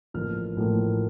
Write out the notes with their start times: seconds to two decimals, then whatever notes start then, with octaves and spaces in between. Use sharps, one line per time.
0.14 A1 A2 F3 A#3 F6
0.56 A1 A2 F3 A#3